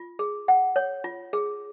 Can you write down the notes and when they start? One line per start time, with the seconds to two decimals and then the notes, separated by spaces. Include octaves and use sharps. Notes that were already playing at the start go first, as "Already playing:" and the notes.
Already playing: F4
0.19 G#4
0.48 F#5
0.76 C#5
1.04 F4
1.33 G#4